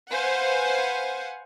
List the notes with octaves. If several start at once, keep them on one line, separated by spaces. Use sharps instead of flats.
B4 C5 F5 F#5 G#5